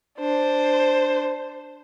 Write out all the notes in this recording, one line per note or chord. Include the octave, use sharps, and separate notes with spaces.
D4 C5